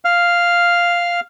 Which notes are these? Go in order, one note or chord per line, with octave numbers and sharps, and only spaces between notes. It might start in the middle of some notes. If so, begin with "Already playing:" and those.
F5 F6